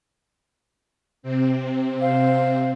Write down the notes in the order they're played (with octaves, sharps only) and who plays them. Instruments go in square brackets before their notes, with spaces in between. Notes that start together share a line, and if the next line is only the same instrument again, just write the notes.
[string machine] C3 C4
[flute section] C5 F5